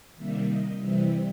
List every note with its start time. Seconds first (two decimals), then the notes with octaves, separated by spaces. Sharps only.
0.17 C3 D#3 G3 A#3 E5
0.48 D#5
0.80 C3 E3 G3 C4 E5